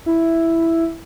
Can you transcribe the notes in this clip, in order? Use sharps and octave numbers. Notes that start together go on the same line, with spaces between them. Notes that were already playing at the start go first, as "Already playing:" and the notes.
E4